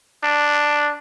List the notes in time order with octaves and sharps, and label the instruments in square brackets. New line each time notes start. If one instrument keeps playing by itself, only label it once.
[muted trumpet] D4